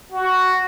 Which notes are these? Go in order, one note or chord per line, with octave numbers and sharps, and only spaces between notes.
F#4